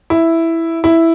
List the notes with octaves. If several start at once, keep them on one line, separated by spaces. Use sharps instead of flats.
E4
E4